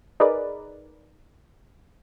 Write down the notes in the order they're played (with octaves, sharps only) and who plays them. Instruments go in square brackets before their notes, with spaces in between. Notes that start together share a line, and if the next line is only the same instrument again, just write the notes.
[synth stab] D#4 G#4 A#4 B4 D5